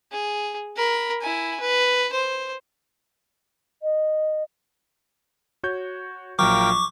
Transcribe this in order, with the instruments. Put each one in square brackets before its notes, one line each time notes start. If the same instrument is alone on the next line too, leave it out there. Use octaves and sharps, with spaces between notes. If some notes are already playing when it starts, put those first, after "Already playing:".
[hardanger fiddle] G#4
A#4 B5
E4 G#5
B4
C5
[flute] D#5
[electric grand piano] F#4 C#5 G6
[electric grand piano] A#1 F3 F#3 [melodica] A#4 F5 G5 [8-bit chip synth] C#6 D6